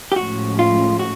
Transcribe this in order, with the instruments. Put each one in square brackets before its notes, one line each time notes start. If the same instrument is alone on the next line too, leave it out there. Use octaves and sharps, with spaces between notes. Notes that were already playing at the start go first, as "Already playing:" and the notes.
[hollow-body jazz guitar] G4
[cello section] A2 F3 G#3 C#4 [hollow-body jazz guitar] F#4
[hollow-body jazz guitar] F4
F#4